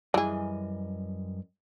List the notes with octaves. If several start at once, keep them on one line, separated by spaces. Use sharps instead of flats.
F#2 E3 G3 G#4 D#5